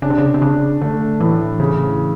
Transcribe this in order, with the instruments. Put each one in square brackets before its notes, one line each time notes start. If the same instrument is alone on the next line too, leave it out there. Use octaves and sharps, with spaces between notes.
[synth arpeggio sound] C#3 [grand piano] D4
[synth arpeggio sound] C3
C#3
C3
[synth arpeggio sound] C#3 [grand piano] D4
[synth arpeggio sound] D3 [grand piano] A3
[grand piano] A2 [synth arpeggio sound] E3
[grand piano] C#3